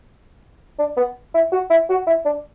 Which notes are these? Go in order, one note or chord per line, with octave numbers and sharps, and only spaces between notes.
D4
B3
E4
F#4
E4
F#4
E4
D4